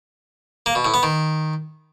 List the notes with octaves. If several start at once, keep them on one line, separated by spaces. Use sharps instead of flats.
A#3
B2
A2
B3
D#3